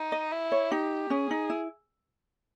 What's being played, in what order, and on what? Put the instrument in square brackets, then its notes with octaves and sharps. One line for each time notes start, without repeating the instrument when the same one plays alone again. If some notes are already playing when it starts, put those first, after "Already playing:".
Already playing: [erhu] D#4
[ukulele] D#5
[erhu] E4
[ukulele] C#5
[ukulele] D#4 [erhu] G4
[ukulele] C#4 [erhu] G#4
[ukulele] D#4
E4